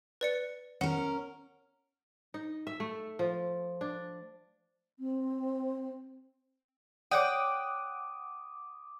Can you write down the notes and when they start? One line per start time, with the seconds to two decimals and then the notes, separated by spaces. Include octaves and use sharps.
0.21 B4 D5 C#7
0.81 C#4 A#4 F#5
2.34 D#4
2.67 E5
2.80 A3
3.19 F3
3.81 D4
4.99 C4
7.11 C#5 D5 F#5 G5 D6 D#6